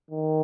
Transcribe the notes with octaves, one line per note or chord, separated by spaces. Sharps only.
D#3